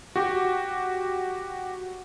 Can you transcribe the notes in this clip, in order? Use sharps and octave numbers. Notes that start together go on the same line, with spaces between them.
F#4 G4